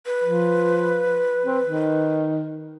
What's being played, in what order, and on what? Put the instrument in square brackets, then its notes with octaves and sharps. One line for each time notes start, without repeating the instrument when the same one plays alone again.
[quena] B4
[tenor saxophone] F3
C4
D#3